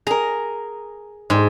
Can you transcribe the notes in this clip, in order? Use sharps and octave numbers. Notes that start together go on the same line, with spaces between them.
G#4 A#4 A#5
G#2